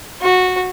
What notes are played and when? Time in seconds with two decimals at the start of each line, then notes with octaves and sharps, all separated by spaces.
0.22 F#4